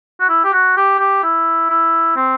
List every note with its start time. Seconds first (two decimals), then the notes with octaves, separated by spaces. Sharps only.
0.20 F#4
0.29 E4
0.44 G4
0.53 F#4
0.77 G4
1.00 G4
1.23 E4
1.70 E4
2.16 C4